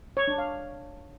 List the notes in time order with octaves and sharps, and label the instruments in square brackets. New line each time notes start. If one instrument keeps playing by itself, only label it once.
[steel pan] C#5
D4
F5